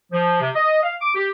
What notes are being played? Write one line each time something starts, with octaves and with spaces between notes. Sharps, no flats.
F3
C3
D#5
F5
D6
G4